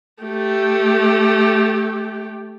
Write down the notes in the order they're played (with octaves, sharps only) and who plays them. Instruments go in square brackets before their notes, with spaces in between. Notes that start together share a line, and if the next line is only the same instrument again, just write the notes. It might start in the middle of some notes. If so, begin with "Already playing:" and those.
[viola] A3 G4